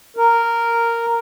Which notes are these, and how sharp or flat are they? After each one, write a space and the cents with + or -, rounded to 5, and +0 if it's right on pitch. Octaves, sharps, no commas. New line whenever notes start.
A#4 -5